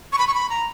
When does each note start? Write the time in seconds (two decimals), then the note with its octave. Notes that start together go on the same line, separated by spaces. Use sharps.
0.13 C#6
0.18 B5
0.28 C#6
0.34 B5
0.50 A#5